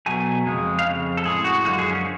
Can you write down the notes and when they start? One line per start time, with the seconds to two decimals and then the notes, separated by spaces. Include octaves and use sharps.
0.06 B2 F#3 A3 G#5
0.46 F2 C#3 G#3
0.79 F5
0.86 F2 C#3
1.17 A4
1.25 A2 G#3 G#4
1.44 F#4
1.65 F#2 D3 F3 G#3 F#4
1.79 G#4
1.91 C#4